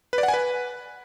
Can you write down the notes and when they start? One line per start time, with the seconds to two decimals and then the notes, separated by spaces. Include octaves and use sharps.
0.13 B4
0.18 D5
0.23 F#5
0.28 G#5
0.34 B4